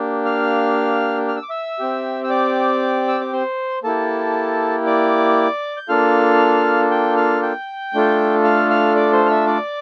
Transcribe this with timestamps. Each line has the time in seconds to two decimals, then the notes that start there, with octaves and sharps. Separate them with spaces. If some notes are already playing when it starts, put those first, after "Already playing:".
Already playing: A#3 D4 G4
0.25 F5 F6
1.28 F6
1.36 E6
1.42 D6
1.50 E5 E6
1.79 C4 G4
2.24 E6
2.30 D5 D6
3.08 E6
3.21 D6
3.33 C5 C6
3.83 A#3 E4 G4 A4 A5
4.86 D5 D6
5.77 G6
5.88 A#3 D4 F4 A4 F5 F6
6.91 G5 G6
7.17 F5 F6
7.42 G5 G6
7.94 A3 D4 F4 A4
8.44 F5 F6
8.70 F5 F6
8.96 D5 D6
9.12 C5 C6
9.25 F6
9.29 E5 E6
9.47 D5 D6